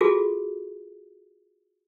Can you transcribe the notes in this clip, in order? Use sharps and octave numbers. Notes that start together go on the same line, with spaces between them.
F4 F#4 G#4 A4